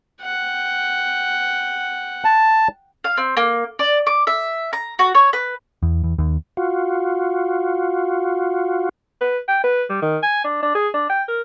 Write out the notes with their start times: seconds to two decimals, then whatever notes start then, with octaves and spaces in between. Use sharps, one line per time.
0.22 F#5 G5
2.25 A5
3.04 F5
3.17 C4
3.37 A#3
3.79 D5
4.07 D6
4.27 E5
4.73 A#5
4.99 F#4
5.15 C#5
5.33 B4
5.83 E2
6.03 E2
6.18 D#2
6.57 F4 F#4
9.21 B4
9.48 G5
9.64 B4
9.90 G3
10.02 D#3
10.23 G#5
10.44 D4
10.62 D4
10.75 G#4
10.94 D4
11.10 G5
11.28 A#4